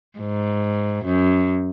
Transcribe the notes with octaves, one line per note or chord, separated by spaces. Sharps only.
G#2
F#2